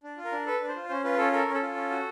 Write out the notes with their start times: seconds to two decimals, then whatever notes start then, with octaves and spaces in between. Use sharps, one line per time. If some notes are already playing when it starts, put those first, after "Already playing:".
0.03 D4
0.17 F4
0.25 A#4
0.32 D4
0.46 A4 B4
0.61 D4
0.69 C5
0.76 F4
0.89 C#4 C5
1.04 F4 B4
1.18 C#4 A4
1.32 A4 A#4
1.48 C#4
1.54 A4
1.62 F4
1.76 C#4
1.91 F#4